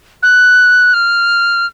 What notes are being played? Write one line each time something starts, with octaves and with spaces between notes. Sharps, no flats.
F#6
F6